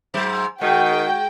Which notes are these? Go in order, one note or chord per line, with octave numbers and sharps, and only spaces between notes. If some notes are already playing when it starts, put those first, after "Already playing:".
G#2 F#3 C5
D#3 G#3 F#4 G5